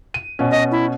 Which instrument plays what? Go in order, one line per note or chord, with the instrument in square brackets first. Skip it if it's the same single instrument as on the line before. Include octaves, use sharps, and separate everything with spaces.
[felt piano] D#7
B2 C#4
[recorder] D#5
E4